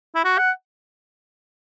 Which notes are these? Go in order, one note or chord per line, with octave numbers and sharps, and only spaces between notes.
E4
F#4
F#5